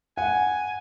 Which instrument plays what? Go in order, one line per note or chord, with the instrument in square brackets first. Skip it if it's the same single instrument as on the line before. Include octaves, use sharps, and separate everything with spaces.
[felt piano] F#5 [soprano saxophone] G#5